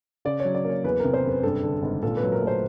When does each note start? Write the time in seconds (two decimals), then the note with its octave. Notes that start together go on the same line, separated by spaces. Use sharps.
0.25 C#3 D5
0.40 C#5
0.45 F#3
0.55 D5
0.65 A#3
0.70 C#5
0.84 E2 B4
1.00 C3 A#4
1.14 C5
1.24 F#1 B4
1.43 G2 A4
1.64 D3
1.83 G#1
2.03 A#2 A4
2.17 B4
2.23 F#3
2.32 A#4
2.42 A3 C5